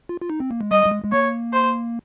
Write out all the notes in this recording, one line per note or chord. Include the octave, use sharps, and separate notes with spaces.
F4
F4
D#4
C4
A#3
G#3
G3 D#5
G3
G#3
G#3
A#3 C#5
C5